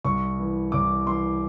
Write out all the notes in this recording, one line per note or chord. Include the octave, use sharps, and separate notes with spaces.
C2 C#6
E3
C2 D6
E3 C6